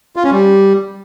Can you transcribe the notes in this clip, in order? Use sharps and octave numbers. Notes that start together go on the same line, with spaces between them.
F4
C#4
G3